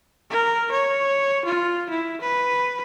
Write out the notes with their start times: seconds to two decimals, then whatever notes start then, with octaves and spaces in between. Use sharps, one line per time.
0.30 A#4
0.71 C#5
1.45 F4
1.89 E4
2.21 B4